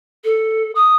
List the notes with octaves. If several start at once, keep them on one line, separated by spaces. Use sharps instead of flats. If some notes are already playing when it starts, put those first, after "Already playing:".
A4
D#6